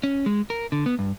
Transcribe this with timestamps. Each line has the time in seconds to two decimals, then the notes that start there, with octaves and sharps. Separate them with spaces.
0.03 C#4
0.26 G#3
0.50 A#4
0.72 D3
0.86 B3
0.99 G2